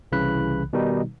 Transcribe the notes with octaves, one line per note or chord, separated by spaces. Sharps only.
C2 C#3 E3 B5 F#6
B2 D#3 G3 D#4